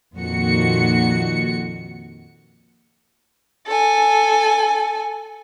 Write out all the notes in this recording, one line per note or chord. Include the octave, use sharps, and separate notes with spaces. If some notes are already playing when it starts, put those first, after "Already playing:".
F2 A#2 D#3 F#4 C#7
A4 G#5